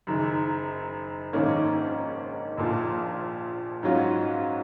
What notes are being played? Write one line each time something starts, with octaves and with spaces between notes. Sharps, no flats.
F#1 F#2 D#3
A#1 G#2 D#3 A#3 C#4
A#1 A#2 F3
G#2 F#3 C#4 F4